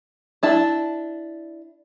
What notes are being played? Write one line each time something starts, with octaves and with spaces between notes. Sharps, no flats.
D4 E4 A5